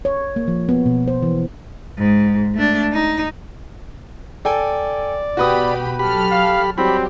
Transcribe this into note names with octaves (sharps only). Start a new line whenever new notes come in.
C#5
A#3
F3
B3
B2
C5
E3
G#2
A3 D4
D#4
A4 D5 G5 G#5
B2 F#4 G4 B4 B5 D#6
F#3 G4 A4 B5 F6
F5
F#3 G3 C4 G4 B5